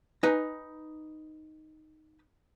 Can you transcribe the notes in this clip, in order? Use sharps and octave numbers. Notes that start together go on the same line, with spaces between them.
D#4 B4 G#5 A#5